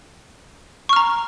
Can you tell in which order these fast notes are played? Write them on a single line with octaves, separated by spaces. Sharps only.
C#6 F6 A#5